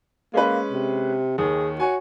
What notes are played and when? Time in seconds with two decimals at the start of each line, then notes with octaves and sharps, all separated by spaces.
0.34 G#3 A#3 C#4 B4
0.72 C3
1.38 D#2 D#3 G#4
1.80 F#4 C#5 G#5